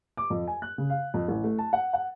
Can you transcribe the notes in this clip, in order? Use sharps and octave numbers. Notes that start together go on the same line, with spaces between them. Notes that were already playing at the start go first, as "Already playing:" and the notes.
D6
F2
G#5
F#6
C#3
F5
F2
A1
A3
A5
F#5
F#5